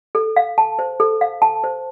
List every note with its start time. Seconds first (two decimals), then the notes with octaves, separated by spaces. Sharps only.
0.15 A4
0.36 F5
0.58 A5
0.79 C5
1.00 A4
1.21 F5
1.42 A5
1.64 C5